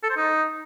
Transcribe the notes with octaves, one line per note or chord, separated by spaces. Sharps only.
A4
C5
D#4